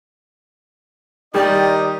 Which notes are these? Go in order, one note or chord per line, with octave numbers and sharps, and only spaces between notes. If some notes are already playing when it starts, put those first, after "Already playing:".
D#3 G3 D#4 G4 D5 D#5